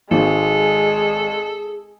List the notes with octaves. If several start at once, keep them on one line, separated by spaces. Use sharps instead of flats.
G#1 G#3 G#4 A4